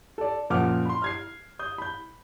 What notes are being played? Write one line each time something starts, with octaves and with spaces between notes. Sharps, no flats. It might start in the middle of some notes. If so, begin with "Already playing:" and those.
A4 D5
F#2 A#2 F3 F#5 D6 F6
B5 C6
F6 G#6 C7
D#6 G6
B5 G6